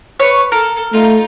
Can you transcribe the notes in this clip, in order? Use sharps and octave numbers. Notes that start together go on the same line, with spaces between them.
B4 C#5
A4 A#4
A3 D#4 F4